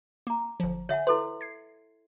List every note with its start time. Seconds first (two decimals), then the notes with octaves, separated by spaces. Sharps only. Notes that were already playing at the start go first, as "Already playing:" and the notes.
0.27 A#3 A#5 D6
0.60 G1 F3
0.89 D3 C#5 E5 F#5 G#5
1.07 E4 A4 B4 C6
1.41 G#6 C7